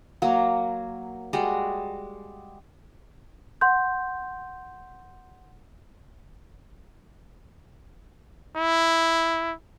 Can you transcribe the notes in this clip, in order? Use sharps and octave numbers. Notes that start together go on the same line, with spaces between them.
F#3 A#3
G3 G#3 F#4
F#5 C6 G6
E4